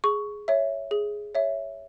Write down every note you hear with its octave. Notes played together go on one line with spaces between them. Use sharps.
G#4 C#6
C#5 E5
G#4
C#5 E5